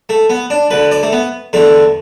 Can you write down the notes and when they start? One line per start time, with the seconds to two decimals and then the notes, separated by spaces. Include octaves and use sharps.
0.09 A3
0.30 B3
0.50 D4
0.71 D2 D3 B4
0.91 D5
1.03 A3
1.12 B3
1.53 E2 D3 A3